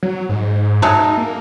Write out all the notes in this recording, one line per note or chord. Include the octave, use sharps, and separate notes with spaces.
F#3
G#2
F#3 G#3 A3 D#4
A#3